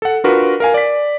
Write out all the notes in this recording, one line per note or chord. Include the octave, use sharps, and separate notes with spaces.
A4 F#5
D4 F4 F#4 A#4 B4
A#4 F5 G#5
D5 B6